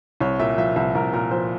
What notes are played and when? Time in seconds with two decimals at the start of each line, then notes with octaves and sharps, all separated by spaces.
0.20 C2 C#5
0.39 A#2 E5
0.58 F3 E5
0.76 C2 E5
0.95 C2 A#4
1.13 A#2 A#4
1.31 F3 C5